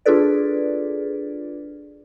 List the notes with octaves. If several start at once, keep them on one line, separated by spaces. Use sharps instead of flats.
D4 F4 G#4 A4 B4 D5